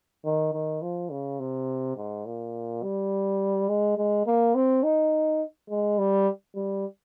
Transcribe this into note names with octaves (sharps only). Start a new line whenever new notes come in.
D#3
D#3
F3
C#3
C3
G#2
A#2
G3
G#3
G#3
A#3
C4
D#4
G#3
G3
G3